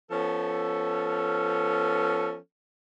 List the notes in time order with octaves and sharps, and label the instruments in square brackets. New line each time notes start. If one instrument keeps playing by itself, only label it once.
[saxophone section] F3 B3 C#4 A4